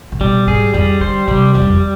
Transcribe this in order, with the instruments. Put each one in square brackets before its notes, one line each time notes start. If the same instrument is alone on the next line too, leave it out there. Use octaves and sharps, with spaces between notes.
[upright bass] C3
[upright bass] B2 [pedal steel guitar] G3
[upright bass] G#2 [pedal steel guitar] G#4
[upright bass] F2 [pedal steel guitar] G3
[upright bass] D3 [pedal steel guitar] C5
[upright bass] C3 [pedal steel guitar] G3
[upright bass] F2 [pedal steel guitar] G3
[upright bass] G2
F2